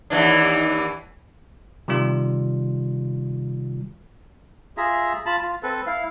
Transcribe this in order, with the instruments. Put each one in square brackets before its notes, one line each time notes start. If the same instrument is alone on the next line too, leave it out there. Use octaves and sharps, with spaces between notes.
[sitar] D#2 E3 D4
[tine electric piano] C3 D#3 G3 F4
[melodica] F4 G#4 E5 A#5
F4 A5 B5
F4
C4 A4 B4
E4 F5